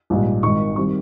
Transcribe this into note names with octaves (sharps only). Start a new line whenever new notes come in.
A#1 G#2 G3
G#1 G#2 D#3 C#6
D#3 G3 C4 C#6